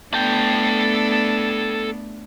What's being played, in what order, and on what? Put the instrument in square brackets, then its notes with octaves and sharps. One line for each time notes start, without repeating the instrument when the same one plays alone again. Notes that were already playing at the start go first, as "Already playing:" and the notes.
[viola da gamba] A3 B3 D4 [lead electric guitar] A4 G5